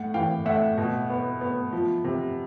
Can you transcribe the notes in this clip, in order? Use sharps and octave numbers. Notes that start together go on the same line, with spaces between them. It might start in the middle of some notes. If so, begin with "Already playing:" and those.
Already playing: A2 F#5
E3 F5 G5
A2 E5 F#5
B2
B3
B3
F3
C3